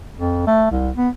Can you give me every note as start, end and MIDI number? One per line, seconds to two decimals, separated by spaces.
0.17 0.43 41
0.47 0.68 57
0.71 0.90 36
0.96 1.09 59